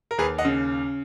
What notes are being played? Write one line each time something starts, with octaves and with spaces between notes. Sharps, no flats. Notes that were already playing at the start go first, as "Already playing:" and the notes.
A#4
D#2 G#4 B4
D#5 F#5
C#3